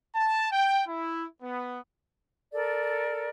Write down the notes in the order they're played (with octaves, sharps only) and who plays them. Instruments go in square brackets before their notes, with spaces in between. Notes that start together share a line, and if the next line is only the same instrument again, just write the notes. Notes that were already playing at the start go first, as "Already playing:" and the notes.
[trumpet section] A5
G5
E4
B3
[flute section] A4 A#4 D5